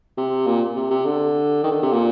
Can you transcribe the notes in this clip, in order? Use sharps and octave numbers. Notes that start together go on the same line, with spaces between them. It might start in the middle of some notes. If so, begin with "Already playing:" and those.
C3
A#2
C3
C3
D3
D#3
D3
C3
A#2